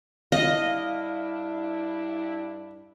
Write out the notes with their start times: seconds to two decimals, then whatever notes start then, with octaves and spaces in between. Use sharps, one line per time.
0.32 G2 D4 E4 D#5 F5